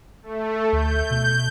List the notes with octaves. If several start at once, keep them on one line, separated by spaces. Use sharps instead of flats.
A3
D2 G6
B2